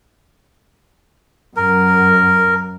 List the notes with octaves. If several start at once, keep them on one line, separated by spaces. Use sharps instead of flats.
F#2 A#4